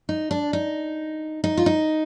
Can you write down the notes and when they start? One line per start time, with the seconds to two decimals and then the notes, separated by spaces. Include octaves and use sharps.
0.09 D#4
0.31 D4
0.53 D#4
1.44 D#4
1.57 F4
1.66 D#4